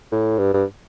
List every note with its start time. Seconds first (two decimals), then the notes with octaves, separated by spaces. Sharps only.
0.12 A2
0.38 G2
0.53 G2